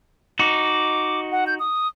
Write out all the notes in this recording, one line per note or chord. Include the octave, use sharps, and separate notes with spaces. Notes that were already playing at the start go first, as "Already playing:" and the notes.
D#4 F#4 D6
F#5
G6
D#6